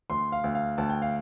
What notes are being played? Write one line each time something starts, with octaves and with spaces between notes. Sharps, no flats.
D2 C6
F5
D2
F5
D2 A5
G5
F5